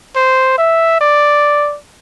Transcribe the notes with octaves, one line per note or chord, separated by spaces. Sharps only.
C5
E5
D5